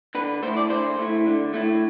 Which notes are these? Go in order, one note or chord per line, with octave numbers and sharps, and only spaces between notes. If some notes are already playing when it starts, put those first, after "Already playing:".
D3 B4
A3 E4 C5
D5
D3 C5
A3 E4
D3
A3 E4